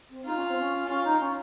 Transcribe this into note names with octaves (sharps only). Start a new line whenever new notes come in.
C4
D#4 F4
C#4
C4
C#4
C#4 F4
D#4
C#4